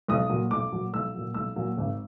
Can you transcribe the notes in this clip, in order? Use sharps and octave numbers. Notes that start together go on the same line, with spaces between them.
B1 D#6
A#2 F#3
B1 D6
A#2 F#3
B1 E6
A#2 F#3
B1 E6
A#2 F#3
G#1